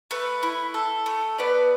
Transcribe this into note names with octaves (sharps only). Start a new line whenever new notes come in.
A3 B4
E4
A4
A3
B3 B4 D5